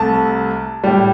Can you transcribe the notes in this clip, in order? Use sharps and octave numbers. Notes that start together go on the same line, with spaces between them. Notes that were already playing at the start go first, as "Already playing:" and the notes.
Already playing: C2 C3 A3 A5
A2 G3